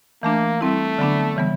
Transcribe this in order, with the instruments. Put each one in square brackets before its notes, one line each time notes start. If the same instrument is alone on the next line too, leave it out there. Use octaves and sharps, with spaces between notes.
[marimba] E3 A3 D4 [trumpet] A#3
[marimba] G3 C4 E4 [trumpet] A3
[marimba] D3 F#3 B3 D4
C#3 E3 G3 B3